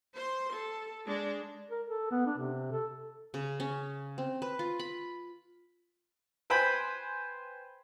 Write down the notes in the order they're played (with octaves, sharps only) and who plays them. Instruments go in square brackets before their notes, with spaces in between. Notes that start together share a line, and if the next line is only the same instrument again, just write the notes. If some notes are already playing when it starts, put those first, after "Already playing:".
[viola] C5 C6
A4
G#3 D4
[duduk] A#4
A4
B3
D4
C3
A4
[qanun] C#3
C#4
C4
B4
F4
B5
[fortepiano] B4 C5 G5 G#5 B5 C6